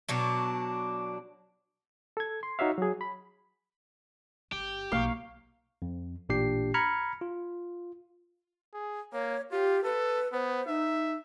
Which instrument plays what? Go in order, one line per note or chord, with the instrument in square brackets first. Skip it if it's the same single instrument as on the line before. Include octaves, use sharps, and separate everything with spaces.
[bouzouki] B2 F#3 D4
[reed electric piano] A4 G#6
C6
D#4 F#4 C#5 E5 F5
F#3 G#4
B5
[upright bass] G1 [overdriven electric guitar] G4
[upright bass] B1 B2 [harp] A#3 C#6 [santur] F5
[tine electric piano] F2
A1 A#2 D4 G4 G5 C7
A#5 B5 F6 G#6 C#7
F4
[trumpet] G#4
[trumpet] A#3 [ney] C#5
[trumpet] F4 [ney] G4
[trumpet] A4 [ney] B4
[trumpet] B3 [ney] C5
[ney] D#4 [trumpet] E5